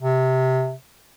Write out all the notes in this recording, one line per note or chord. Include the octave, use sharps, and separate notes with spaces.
C3